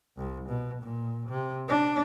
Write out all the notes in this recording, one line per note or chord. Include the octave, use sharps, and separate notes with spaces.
C2
B2
A#2
C3
D4